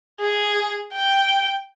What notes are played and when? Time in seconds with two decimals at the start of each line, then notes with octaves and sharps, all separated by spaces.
0.20 G#4
0.93 G5